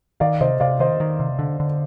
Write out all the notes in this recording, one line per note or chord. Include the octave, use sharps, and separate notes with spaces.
D#3 D5 F5
C3 C5 D#5
C3 D5 F5
D#3 C5 D#5
D#3
C3
D3
D3